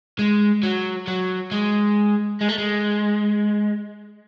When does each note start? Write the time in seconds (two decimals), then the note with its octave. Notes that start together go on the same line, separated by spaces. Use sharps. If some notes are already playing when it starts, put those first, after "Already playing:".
0.19 G#3
0.63 F#3
1.07 F#3
1.52 G#3
2.41 G#3
2.49 A3
2.58 G#3